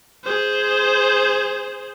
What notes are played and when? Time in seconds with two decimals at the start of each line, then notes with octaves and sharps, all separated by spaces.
0.24 G#4 C5